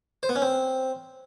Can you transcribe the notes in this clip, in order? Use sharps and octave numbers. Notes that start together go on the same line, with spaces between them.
C5
B3
C#4
C4